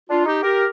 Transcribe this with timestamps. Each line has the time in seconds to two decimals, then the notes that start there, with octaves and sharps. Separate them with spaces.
0.09 D4 F4
0.26 D#4 G4
0.43 G4 A#4